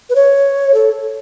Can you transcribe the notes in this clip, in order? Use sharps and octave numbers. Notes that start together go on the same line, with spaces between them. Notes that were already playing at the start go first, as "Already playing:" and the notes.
B4
C#5
A4